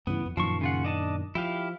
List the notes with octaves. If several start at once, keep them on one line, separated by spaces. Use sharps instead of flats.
G2 C#3 E3 B3
F2
F#2 A#2 D#3 F3 C#6
C#3 F4 F#5
D4 D#5 A5
F3 E4 G4 F5